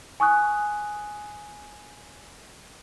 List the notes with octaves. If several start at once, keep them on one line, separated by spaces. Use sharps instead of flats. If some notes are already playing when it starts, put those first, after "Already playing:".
G#5 C#6 D#6 F#6